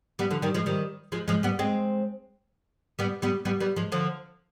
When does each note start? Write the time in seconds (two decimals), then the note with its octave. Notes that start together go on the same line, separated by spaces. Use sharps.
0.19 G3 B3
0.31 D3 F3
0.42 D#3 G3
0.54 F3 G#3
0.66 D#3 G3
1.12 F3 G#3
1.28 F3 G#3
1.43 G3 B3
1.59 G#3 C4
2.99 G3 B3
3.22 G3 B3
3.45 G3 B3
3.60 G3 B3
3.76 F3 G#3
3.92 D3 F3